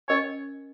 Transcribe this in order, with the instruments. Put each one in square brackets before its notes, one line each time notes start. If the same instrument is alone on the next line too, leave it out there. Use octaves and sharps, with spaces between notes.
[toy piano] C#4 A#4 D#5 G#5 [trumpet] C#5